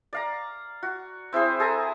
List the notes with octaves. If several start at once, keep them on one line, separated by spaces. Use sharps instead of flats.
D5 F5 A#5
F#4
C4 E4 G#4 C5
G#4 A4 G#5 A#5